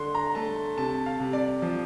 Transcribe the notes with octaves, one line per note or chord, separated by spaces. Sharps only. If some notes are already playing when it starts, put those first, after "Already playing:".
Already playing: D3 D4 C6
A#5
A3 A5
C3 A5
F5
C3
D5
F3